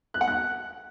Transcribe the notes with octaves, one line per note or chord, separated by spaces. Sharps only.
F#6
F#5
F#6